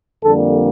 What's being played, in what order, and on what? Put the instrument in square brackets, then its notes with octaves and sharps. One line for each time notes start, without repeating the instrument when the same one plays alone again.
[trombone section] F2 D3 G3 A#3 A4